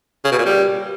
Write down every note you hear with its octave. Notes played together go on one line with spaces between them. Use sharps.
C#3
B2
A#2
G3